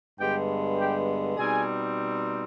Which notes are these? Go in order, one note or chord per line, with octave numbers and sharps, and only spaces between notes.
G2 D3 G#3 B3 G4 G5
G4 G5
B2 G3 C4 D#4 G#4 G#5